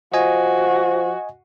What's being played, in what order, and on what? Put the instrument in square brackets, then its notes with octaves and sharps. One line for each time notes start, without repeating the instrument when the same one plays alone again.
[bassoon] F3 [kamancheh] F#4 [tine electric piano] D#5 G#5